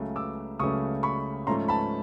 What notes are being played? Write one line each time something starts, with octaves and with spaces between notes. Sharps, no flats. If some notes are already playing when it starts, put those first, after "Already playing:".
Already playing: C#2 C#3 F#3 A3 C#4
D6 E6
C#2 C#3 F#3 A3 C#4 C#6 D#6
B5 C#6
G#2 F3 A3 C#4 A#5 C6
A5 B5